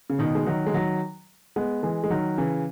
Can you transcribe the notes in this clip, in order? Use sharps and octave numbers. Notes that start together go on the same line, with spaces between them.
C#3
B2 D#3
G#3
D#3 F#3
G#3
D#3 F#3
G#3 B3
E3 G#3
G#3
D#3 F#3
C#3 E3